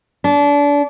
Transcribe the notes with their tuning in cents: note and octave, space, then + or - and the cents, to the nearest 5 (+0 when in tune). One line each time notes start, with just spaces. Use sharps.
D4 -30